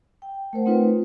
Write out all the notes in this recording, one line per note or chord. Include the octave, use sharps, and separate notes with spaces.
G5
A3 A#4 C5 F#5
A3 C4 D#4 F4 B4